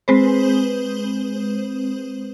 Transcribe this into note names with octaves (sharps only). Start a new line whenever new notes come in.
G#3 C4 B4 C5